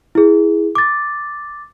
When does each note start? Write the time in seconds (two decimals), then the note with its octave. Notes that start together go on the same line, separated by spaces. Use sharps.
0.15 E4 G#4
0.75 D6 A6